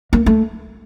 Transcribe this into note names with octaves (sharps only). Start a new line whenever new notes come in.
A#3
A3